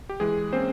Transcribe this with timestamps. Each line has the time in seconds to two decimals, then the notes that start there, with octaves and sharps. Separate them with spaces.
0.09 G4
0.20 E3 G#3 G#4
0.53 A#3 C4 C#4 C5